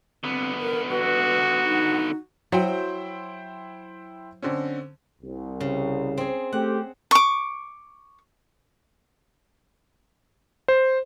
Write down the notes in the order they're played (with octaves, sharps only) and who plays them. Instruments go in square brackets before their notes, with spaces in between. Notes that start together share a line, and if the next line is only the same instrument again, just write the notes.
[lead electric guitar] D3 B3 [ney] C4
[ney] A#4
[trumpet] F#4 [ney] B4
[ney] D#4
[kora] F#3 [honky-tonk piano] E4 C5 G5
[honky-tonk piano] D3 C4 C#4
[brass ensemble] C2
[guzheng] C#3
C4 G#4
[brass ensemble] A3 C4 G4 [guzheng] F#5
[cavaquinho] C#6 D6
[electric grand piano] C5